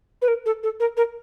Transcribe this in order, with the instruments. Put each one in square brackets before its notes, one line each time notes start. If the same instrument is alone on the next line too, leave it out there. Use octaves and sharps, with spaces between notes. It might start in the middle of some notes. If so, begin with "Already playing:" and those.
[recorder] B4
A#4
A4
A4
A#4
A#4